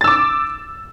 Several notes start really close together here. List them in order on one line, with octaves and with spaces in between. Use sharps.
A6 E6 D6